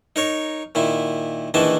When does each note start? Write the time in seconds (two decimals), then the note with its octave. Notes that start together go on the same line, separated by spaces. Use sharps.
0.16 D#4 A#4 C#5
0.75 A#2 D#3 E4
1.54 A#1 D#3 E3 E4 D#5 A5